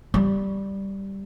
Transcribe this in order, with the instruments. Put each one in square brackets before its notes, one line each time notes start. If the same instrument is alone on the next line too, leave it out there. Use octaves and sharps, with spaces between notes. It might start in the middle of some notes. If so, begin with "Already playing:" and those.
[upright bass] G3